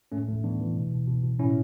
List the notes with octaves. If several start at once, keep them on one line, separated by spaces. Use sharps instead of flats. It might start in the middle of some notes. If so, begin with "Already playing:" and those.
A2 A3 C#4
A2 A3
E3 B3 D4
E3
B2
B2
B2
B2
A2 C#4 E4